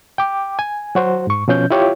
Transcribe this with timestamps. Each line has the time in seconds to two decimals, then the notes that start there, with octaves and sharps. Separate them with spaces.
0.18 G5 D6
0.59 G#5
0.95 F#3 F#4 C5
1.27 G#2 C#6
1.48 B2 F3 C#4 G6
1.70 E4 F4 G4 C#5